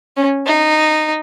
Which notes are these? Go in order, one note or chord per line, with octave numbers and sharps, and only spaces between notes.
C#4
D#4